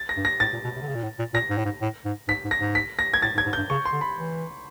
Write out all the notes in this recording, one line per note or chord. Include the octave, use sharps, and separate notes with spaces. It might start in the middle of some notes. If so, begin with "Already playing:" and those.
Already playing: A6
A#6
G2
A#6
A2 A6
A#2
B2
C3
D3
C#3
A#2
A2
A#2
A#2 A#6
G#2
A2
G#2
A2
G#2
G#2 B6
G#2
A#6
G#2
B6
A#6
G#6
A2 A6
G#2
G#6
G#2
G2 G6
C#3 C#6
C6
D3
B5
E3